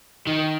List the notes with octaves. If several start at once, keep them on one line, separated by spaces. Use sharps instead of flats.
D#3